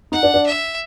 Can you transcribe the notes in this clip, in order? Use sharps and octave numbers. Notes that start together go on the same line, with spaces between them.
D#4 F#5
D4
D4
E5